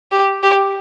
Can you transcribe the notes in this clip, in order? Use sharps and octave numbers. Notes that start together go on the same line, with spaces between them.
G4
G4